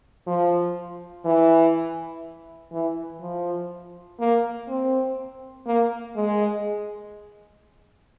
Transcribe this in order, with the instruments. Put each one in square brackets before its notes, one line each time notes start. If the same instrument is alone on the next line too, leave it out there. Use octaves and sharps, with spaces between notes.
[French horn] F3
E3
E3
F3
A#3
C4
A#3
G#3